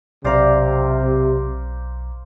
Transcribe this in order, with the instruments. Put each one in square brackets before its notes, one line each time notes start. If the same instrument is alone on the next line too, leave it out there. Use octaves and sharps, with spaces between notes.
[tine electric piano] B1 A#5 [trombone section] C3 [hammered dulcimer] C5 D5 F5